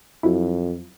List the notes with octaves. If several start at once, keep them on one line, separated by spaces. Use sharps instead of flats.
F2 F#3 E4